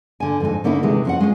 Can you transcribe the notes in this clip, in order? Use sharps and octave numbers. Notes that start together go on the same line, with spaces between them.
D3 G#5
F2 G#2 D#4 G#5
D3 A#3 C#4 D#4 E4
D#2 C3 E3 G#3 A3
F2 C#4 F#5
G#3 C#4 D#4 F4